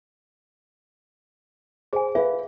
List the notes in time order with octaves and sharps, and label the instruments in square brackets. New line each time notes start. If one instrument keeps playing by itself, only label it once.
[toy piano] G#4 G#5 [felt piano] C5
[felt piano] B4 [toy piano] E5 F5